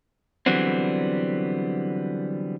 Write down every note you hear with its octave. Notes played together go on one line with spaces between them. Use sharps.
D3 E3 F#3 G3 B3 C4